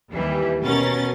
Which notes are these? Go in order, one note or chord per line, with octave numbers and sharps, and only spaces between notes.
D#2 E3 G3
B2 C#4 A#4 A6